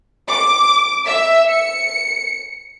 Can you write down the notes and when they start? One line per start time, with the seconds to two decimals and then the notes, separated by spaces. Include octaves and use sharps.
0.29 D6
1.06 E5
1.49 C#7